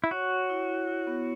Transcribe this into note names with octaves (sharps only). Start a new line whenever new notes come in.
E4
F#4 C#5
C#5
E4
E4
E4
B3